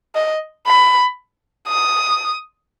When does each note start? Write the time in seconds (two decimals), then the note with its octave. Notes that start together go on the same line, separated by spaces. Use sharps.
0.15 D#5
0.66 B5
1.68 D#6